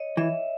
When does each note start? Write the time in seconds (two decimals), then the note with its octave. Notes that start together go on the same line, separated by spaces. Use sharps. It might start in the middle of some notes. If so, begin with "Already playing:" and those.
Already playing: C#5 D#5
0.17 E3 E5